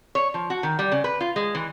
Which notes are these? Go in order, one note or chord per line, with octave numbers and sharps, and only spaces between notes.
C#5
F3
F#4
D#3
G3
C#3
B4
F4
G#3
E3